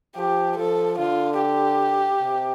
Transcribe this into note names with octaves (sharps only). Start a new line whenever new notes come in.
F3 G4
F3 A4
D3 F4
G4
C3